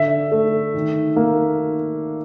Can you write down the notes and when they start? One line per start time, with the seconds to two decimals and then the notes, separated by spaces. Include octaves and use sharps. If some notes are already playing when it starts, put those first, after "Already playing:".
Already playing: D3 E5
0.32 A3
0.74 D#3
1.16 A#3